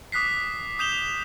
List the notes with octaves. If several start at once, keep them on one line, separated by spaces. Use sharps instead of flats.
D6 D#6 F#6 B6 C7
D#6 G6 E7 F7 G7